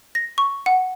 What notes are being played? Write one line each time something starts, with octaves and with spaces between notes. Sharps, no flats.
A#6
C#6
F#5